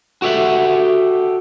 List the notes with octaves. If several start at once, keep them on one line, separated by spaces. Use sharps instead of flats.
F#4 G4 A4 E5 F#5